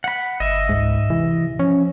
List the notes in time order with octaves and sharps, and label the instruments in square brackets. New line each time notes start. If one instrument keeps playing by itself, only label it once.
[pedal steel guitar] F#5 B5
[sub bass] G1 [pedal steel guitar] D#5 E5
[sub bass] C#2 [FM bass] G#2
[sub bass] C3 [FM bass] E3
[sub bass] F3 [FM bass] C#4